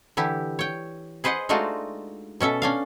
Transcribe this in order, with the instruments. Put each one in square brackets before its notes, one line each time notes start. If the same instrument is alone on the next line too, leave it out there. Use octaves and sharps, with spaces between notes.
[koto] D3 E3 E4 G4
C#5 G5
G#4 B4 C5 D#5 F#5
G#3 A3 D4 D#4 F4 F#4
B2 C#4 A4 E5
C#4 D4 F5